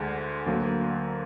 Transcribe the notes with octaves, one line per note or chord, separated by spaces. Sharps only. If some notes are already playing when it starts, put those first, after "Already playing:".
Already playing: D2 D3 G#3
D2 D3 F#3 A#3